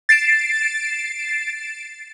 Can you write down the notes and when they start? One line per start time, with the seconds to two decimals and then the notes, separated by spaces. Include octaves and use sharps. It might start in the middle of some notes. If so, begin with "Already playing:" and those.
0.09 A6 C7 D7 E7